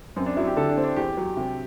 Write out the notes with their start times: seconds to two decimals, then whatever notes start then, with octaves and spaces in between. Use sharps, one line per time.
0.16 F#2 C4
0.26 D4
0.37 F#3 E4
0.47 G4
0.56 D3 A4
0.69 D4
0.77 C4
0.84 D4
0.96 E2 G4
1.17 F#3
1.37 C3